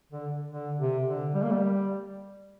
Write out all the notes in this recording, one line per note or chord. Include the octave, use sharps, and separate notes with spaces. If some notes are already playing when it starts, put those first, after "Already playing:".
D3
D3
C3
D3
G3
A#3
G3